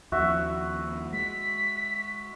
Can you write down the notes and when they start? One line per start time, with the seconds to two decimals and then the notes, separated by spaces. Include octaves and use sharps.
0.12 D#2 F3 F#4 E5
1.13 G#3 B6